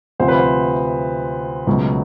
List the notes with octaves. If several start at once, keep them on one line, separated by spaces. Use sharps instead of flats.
D2 C3 F3 C5
B4
C5
C#2 B2 F#3 A3